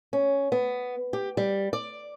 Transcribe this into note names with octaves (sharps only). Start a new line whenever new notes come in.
C#4
B3
G4
G3
D5